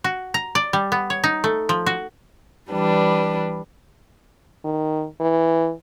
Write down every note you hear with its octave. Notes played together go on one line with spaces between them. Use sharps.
F#4
A#5
D5
G3
B3
C#5
D#4
A3
F3
F#4
E3 G3 D4 B4
D#3
E3